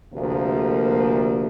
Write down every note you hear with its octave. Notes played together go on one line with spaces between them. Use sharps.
D2 C3 F3 A#3